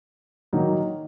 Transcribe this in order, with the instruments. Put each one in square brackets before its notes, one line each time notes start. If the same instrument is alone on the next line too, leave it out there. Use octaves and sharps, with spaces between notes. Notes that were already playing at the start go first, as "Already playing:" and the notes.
[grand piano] D#3 F#3 A#3 D#4